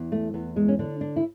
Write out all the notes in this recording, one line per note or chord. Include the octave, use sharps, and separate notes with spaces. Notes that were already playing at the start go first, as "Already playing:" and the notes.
Already playing: E2
A3
E2 B3
G#3
C#4
D3 D4
D4
E4